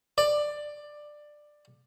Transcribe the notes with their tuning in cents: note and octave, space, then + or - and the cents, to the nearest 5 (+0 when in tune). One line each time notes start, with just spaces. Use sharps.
D5 +15